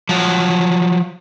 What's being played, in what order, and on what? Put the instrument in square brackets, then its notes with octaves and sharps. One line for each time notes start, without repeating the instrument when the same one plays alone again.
[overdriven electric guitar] F3 F#3